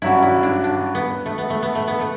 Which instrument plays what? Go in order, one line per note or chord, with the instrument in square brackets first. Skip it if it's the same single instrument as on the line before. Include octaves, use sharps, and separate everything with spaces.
[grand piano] G2 F#3 C#4 F#4 [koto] E4
[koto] E4
D4
D4
B3
A3
B3
A3
B3
A3
B3
A3